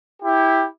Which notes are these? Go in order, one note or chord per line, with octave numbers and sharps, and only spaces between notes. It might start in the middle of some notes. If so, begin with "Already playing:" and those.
E4 G4